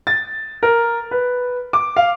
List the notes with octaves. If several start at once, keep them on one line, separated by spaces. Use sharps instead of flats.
A6
A#4
B4
D6
F5